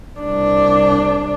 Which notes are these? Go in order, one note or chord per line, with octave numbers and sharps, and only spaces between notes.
C2 D4